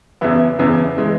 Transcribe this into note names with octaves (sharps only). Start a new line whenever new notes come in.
E2 C#3 E3 B3 E4
E2 C#3 E3 B3 E4
E3 G#3